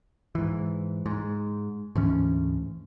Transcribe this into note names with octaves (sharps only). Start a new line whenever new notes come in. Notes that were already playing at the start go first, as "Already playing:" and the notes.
G#2 E3
G#2
D2 G#2 E3 C#4